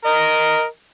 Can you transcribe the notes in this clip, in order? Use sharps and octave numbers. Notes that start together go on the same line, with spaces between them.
A#4 D#5